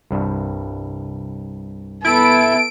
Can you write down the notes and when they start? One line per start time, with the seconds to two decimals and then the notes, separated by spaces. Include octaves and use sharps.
0.11 C2 G2
2.04 B3 E4 A4 D7